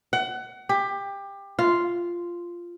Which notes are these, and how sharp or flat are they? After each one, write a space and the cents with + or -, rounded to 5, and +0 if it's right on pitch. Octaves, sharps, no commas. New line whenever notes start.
F#5 +25
G4 +20
F4 -5